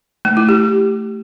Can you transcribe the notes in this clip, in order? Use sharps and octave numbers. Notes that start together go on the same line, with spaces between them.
A3
E4
G4